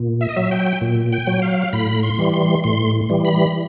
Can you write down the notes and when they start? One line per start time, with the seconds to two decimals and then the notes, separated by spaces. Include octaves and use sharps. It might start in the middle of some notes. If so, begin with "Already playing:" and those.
Already playing: A#2
0.21 E5
0.29 D#5
0.36 F#3 E5
0.51 G5
0.81 A#2
1.12 G5
1.27 F#3
1.42 F5
1.73 A2 B5
2.03 C6
2.19 E3 G3
2.33 C6
2.64 A2 C6
3.10 E3 G3
3.25 B5